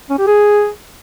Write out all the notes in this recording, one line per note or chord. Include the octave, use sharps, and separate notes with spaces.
C#4
G4
G#4